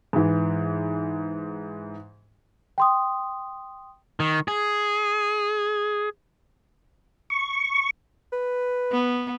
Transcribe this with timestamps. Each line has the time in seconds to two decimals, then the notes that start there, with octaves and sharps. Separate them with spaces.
0.13 G#2 E3
2.78 G5 C6 D#6
4.20 D#3
4.48 G#4
7.30 C#6
8.33 B4
8.92 B3